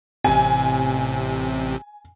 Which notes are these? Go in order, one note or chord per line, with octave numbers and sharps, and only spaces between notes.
A1 C3 G#5